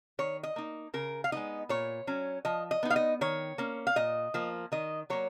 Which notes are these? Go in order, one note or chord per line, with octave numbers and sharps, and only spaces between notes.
D#3 C#5
D#5
A#3 D#4
C#3 A#4
F5
G#3 B3 D#4 D#5
A#2 C#5
F#3 C#4
F3 D#5
D#5
B3 D#4
F5
D#5
D#3 C#5
A#3 C#4
F5
A#2 D#5
F3 A#3
D#3 D#5
F#3 A#3 C#5